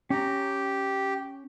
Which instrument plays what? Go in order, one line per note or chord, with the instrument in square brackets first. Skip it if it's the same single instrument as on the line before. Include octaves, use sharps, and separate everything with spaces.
[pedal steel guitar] C#4 A#5 [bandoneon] G4